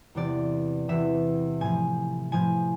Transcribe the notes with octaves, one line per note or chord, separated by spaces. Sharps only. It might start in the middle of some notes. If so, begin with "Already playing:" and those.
E2 C3 E3 D5
E2 C3 E3 E5
A2 F3 G#5
A2 F3 G#5